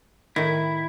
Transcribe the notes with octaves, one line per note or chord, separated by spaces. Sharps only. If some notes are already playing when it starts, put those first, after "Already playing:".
A2 D#3 E4